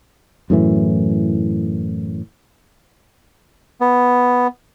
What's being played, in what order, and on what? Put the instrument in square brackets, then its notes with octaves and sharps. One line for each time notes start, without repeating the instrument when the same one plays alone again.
[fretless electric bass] F#2 A2 E3
[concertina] B3